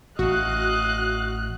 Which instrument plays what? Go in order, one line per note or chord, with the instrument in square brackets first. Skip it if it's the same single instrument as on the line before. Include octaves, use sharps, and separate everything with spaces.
[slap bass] A1 [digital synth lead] F#4 [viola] D#5 F5 [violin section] F#6